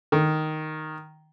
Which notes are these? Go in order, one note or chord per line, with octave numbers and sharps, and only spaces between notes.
D#3